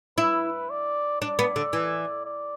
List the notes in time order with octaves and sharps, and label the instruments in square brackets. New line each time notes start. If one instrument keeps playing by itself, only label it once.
[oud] E4 [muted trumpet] B4
[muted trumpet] D5
[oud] D4 [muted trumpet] D5
[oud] B3
D3
E3
[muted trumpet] D5